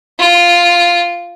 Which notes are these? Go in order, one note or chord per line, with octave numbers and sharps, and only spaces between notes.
F4